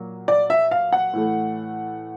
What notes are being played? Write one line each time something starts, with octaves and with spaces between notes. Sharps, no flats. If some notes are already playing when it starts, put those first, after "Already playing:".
Already playing: A#2 F#3 A#3
D5
E5
F5
F#5
A2 E3 A3